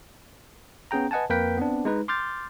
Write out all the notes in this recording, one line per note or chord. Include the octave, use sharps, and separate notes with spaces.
B3 C#4 G#4 G5 A#5
B4 D#5 F#5 G#5 A5
F2 A#3 A#4 B4 G5 B6
B3 C4 D4
G#3 D#4 B4
C6 D6 F6 G6 A6